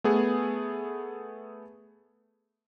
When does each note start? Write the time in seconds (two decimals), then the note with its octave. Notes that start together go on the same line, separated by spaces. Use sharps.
0.04 A3 B3 G#4